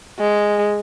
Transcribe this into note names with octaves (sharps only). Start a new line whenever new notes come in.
G#3